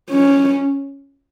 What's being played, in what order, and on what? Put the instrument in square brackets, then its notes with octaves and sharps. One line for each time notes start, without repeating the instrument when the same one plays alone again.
[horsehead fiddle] C#4